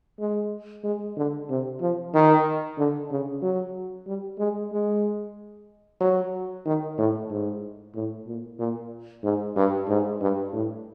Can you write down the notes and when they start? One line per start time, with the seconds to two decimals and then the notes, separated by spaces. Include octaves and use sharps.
0.20 G#3
0.84 G#3
1.17 D3
1.49 C3
1.81 F3
2.14 D#3
2.78 D3
3.11 C#3
3.42 F#3
4.07 G3
4.39 G#3
4.72 G#3
6.01 F#3
6.65 D#3
6.98 A2
7.30 G#2
7.95 A2
8.27 A#2
8.59 A#2
9.23 G#2
9.56 G2
9.88 G#2
10.21 G2
10.53 A2